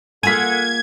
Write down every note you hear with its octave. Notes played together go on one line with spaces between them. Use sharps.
A#3 F4 G#4 A4 F#5 G#6 B6 D#7